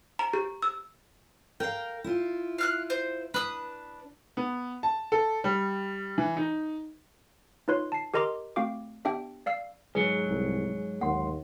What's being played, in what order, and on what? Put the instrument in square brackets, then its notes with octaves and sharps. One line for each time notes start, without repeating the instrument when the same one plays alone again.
[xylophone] A#5
G4
E6
[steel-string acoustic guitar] A#4 F5 [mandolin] G5
[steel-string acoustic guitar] E4 F4
[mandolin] F5 F6 F#6
C5
[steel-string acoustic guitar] D4 [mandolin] B4 D#6
[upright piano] B3
A5
A4
G3
E3
D#4
[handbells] D#4 F4 B4 C#5 C6
A5 C7
G4 A#4 D#5 A#5 C6 D6
A3 C4 F#4 F5 G5 D6
B3 D4 G4 E5 G5
D5 F5 E6 C7
[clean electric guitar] G#2 F#3 [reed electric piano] G#4 [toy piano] B4
[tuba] C2
[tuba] D#2 [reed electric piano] A#3 C6 [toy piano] F#5